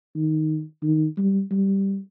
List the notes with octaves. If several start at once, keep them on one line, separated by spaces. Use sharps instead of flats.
D#3
D#3
G3
G3